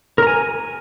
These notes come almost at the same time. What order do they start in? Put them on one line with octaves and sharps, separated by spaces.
A#4 A#5 G#5